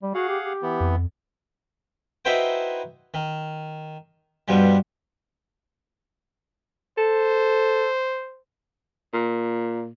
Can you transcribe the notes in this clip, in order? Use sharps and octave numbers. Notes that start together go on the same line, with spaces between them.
G3
F#4 G#4 F5 F#5
G4
G4
E3 B3
F2
D#4 E4 F#4 B4 C5 G5
D#3
G2 B2 F3 G3
A4 C5
A#2